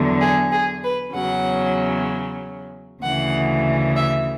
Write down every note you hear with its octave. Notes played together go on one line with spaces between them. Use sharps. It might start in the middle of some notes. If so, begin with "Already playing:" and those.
Already playing: E2 D3 F#3
G#4
G#4
B4
E2 C#3 F#3 F#5
D2 C#3 E3 F#5
E5